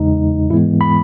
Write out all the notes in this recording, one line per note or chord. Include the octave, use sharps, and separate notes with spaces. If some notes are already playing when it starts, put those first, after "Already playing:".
Already playing: E2 C#3 G#3 D#4
G#2 E3 G#3 B3 E4
B5